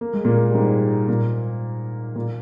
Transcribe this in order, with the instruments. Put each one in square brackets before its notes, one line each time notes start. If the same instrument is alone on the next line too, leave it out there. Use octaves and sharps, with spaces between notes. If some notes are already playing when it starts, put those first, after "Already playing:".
[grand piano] A#3
G#3
A#2 A#3
G3
G#2 G#3
A#2 A#3
A#2 A#3